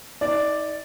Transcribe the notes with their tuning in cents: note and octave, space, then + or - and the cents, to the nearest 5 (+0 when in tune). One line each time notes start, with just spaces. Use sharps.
D#4 +40 D5 +0